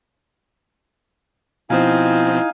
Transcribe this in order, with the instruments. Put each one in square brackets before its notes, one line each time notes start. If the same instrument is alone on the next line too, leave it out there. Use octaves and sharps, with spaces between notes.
[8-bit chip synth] B2 F3 C4 [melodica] D#4 F5 G#5 [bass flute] E4